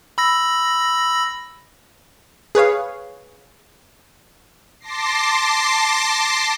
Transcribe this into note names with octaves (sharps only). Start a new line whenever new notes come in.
B5 E6 A#6
G#4 B4 C#5 F5
A5 C6 D6 A#6 C7